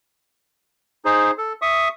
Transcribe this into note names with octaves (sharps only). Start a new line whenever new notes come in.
D#4 G#4 C5
A4
E5 C#6 D#6